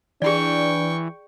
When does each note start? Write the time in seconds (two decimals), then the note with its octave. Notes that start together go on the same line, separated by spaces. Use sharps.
0.22 E3 D4 G#4 D5 G5 C#6